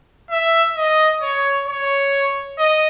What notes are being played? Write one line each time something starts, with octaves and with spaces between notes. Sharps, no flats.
E5
D#5
C#5
C#5
D#5